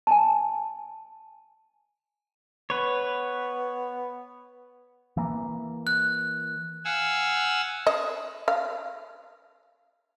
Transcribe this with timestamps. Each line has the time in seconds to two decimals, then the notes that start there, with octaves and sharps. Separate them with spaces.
0.07 G#5 A5
2.70 B3 B4 C#5
5.17 E3 A#3
5.87 F#6
6.85 F5 F#5 G#5 E6
7.87 D#5
8.48 F5